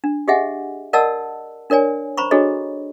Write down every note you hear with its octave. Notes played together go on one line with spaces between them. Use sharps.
D4
G4 G#4 D#5 E5 F#5 G#5
A#4 D5 D#5 F#5 A5 E6
D4 A#4 C#5 D5 G#5
C5 A#5 B5 C#6
D4 F#4 G#4 A4 C#5 D#5